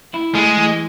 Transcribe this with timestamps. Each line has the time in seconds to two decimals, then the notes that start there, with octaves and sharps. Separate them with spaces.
0.14 E4
0.35 G#3 A3
0.57 E3